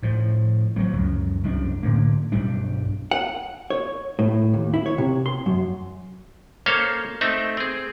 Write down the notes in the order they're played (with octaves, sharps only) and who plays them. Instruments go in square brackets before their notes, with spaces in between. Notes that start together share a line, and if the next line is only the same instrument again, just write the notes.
[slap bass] A2 F3
F3 F#3 A#3
C#2 F#2
C2 F#2 D4
A2 D3 A#3
B1 G2 G3 D4
[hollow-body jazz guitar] F#5
C#5
A2
D#2
E4
C#5
C3
C6
F#2
[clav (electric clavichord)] A#3 C#4 A4 C5 C#5 F5
A3 C4 D#4 E5
C4 G#4